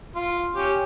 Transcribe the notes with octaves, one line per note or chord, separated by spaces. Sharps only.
F4
C#4 G4